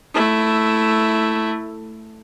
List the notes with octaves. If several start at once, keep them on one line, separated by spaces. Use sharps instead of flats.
A3 E4